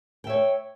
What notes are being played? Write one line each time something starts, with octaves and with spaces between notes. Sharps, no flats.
C#5 E5 G5